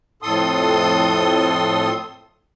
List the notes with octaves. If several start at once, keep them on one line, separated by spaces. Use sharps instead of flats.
F2 A2 A4 C6 D#6